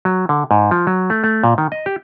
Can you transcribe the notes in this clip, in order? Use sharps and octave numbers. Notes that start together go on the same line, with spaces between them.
F#3
D3
G#2
F3
F#3
A3
A3
A#2
D#3
D#5
G4